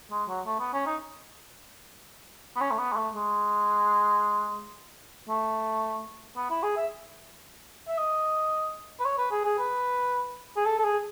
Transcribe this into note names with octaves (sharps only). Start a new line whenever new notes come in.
G#3
F#3
A3
B3
C#4
D#4
B3
C#4
A3
B3
G#3
A3
G#3
A3
B3
E4
G#4
E5
E5
D#5
B4
C#5
B4
G#4
G#4
B4
G#4
A4
A4
G#4